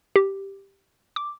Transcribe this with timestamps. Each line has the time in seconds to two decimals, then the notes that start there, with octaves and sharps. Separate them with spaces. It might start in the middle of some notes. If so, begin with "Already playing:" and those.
0.16 G4
1.16 D6